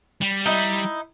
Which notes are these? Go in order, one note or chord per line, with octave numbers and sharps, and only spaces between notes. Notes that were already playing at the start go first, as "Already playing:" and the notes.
G3
D#4 E4